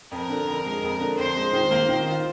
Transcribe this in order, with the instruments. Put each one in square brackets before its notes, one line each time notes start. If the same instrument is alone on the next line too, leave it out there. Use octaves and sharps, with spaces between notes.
[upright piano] F2 [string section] A#4
[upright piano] D3
F2
G#3
F2
D3
[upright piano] F2 [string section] C5
[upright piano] G#3
D#3
A#3
D#3
F4